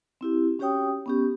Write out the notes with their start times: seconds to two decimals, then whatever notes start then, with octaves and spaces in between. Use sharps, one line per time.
0.21 C4 E4 G4
0.59 C#4 F#4 G4 C#5 G5 D#6
1.06 B3 C#4 G4